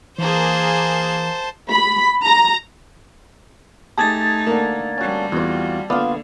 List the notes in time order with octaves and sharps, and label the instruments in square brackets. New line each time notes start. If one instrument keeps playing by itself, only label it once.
[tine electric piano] E3 [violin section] A#3 G#4 [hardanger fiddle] C5 A5
[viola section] B5
A#5
[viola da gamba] A3 D#4 [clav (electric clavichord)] G4 G#4 [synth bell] A5 G#6 A6
[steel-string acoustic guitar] D3 A#3
[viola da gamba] G3 C4 [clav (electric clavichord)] C#4 F#4
[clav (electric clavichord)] E2 [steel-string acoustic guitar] F4 F#4
[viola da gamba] D3 A#3 [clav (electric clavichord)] B3 D5 [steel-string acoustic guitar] F4 F5